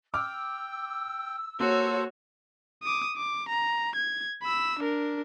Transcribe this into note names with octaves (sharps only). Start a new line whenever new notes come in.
G5 D6 E6 F6
A#3 F#4 A4 C5 C#5
D6 D#6
D6
A#5
G#6
B5 E6
D4 A#4